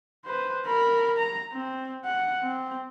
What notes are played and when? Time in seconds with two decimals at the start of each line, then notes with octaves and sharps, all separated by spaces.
0.25 B4 C5
0.66 A#4 B5
1.17 A#5
1.52 C4
2.05 F#5
2.42 C4